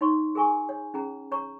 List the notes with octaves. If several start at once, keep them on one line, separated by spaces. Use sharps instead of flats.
D#4 C#5 C6 C#6
G#4 A#4 G#5 C#6
C#5
C#4 G#4 A#5
C#5 A#5 C#6